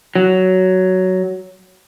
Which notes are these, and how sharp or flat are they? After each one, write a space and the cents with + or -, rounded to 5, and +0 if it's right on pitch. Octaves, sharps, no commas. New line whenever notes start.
F#3 +10